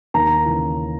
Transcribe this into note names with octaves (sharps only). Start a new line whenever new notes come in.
D#2 A#5
C#3 E3